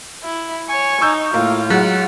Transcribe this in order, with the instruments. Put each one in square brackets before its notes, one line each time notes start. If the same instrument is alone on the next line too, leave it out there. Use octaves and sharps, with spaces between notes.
[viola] E4
[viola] C#5 C#6 [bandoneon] G#5
[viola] D#4 [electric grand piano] C#6 E6 G6
[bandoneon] A2 [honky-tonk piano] A#3 [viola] F4
[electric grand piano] F#3 F#6 [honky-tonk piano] G#3 F#5